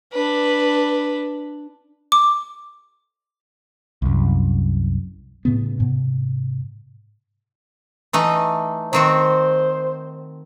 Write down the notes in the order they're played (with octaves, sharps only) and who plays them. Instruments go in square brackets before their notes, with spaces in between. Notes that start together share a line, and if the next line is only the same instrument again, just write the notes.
[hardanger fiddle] D4 B4
[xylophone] D6
[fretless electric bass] C2 F#2
A2 C#3 B3
G#2 C3
[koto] E3 A3 D#4
[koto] D#3 C4 F#4 [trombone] C5